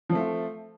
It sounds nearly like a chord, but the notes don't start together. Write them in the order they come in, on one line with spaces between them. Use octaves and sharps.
F3 C4 A3 F4